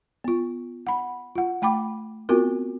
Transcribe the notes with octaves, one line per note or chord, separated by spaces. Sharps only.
B3 F4
F#5 B5
F4 F#5
A3 G5 B5 D6
B3 C4 F4 F#4 A#4